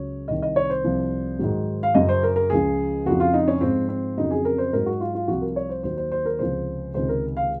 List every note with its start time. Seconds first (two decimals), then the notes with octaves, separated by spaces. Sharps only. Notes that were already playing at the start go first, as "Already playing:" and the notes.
Already playing: C#2 C#3 F#3 C#5
0.28 C2 C3 D#3 D#5
0.42 D#5
0.56 C#5
0.70 C5
0.84 C2 C3 F3
1.39 G#2 D#3 F#3
1.83 F5
1.95 F#2 C#3 F#3 D#5
2.09 C5
2.23 A#4
2.36 A#4
2.50 C#2 C#3 F3 G#4
3.06 F2 C#3 F3 F#4
3.20 F4
3.34 D#4
3.48 C#4
3.61 G#2 F3 C4
3.89 C4
4.18 F2 C#3 F#3 D#4
4.31 G#4
4.45 A#4
4.58 C5
4.73 G#2 F#3 A#4
4.86 F#4
5.01 F4
5.15 F4
5.28 C2 C3 F3 F#4
5.41 A#4
5.56 C#5
5.70 C5
5.83 D#2 D#3 F#3 C5
5.97 C5
6.12 C5
6.26 A#4
6.39 C#2 C3 F3 C5
6.94 C#2 C3 D#3 C5
7.09 A#4
7.37 F5